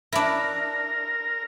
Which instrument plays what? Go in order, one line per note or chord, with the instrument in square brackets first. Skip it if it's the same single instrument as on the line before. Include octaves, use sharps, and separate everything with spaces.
[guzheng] D4 E4 [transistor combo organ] A#4